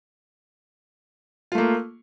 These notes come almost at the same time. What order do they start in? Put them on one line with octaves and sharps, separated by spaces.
F4 A3 A#3